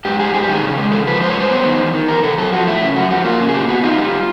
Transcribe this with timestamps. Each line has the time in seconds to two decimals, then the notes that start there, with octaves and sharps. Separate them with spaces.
0.05 G#2 G4
0.19 G3 G#4
0.34 G#2 G#4
0.43 G4
0.49 D#3 G#4
0.63 C#3
0.77 G#3
0.92 C#3 A4
1.07 F3 B4
1.21 G#2 C5
1.30 C#5
1.36 G3 C5
1.50 B3
1.65 D#3
1.79 E2
1.94 D#3
2.08 E2 A#4
2.23 C3 A4
2.38 F#2 A4
2.52 F3 F#4
2.67 A3 E4
2.81 C#3
2.96 F#2 F#4
3.11 F3 F#4
3.24 A#3 F4
3.39 C#3
3.49 G#4
3.54 A#2 G4
3.68 B3 F#4
3.83 D#4 F4
3.98 G3